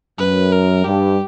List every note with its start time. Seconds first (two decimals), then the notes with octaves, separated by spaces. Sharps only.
0.19 F#2 B4
0.53 A#4
0.85 G2 G4